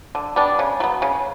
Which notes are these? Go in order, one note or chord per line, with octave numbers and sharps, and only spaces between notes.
D3
G3 B3 D4
C#3
F#3 B3
C#3